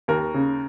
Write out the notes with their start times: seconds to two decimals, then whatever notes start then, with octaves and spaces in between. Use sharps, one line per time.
0.08 D#2 A#4
0.34 C#3